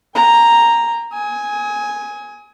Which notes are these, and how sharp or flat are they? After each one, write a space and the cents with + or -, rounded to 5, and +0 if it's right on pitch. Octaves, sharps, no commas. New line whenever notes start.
G5 +40 A#5 +0
G#5 +0 D#6 +35